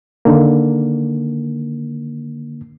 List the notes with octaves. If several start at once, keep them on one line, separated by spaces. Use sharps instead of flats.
D3 D#3 A#3